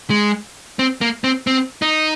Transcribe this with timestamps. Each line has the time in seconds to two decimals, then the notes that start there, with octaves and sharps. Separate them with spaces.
0.10 G#3
0.79 C4
1.01 A#3
1.24 C4
1.47 C4
1.82 D#4